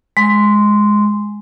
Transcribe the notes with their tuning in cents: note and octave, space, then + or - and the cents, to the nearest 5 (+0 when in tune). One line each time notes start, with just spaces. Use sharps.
G#3 +0 C6 -10